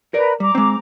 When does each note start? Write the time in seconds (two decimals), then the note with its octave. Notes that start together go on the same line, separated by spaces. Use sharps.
0.14 A#4 B4 D5 A#5
0.40 G3 A#5 D6
0.55 G#3 C4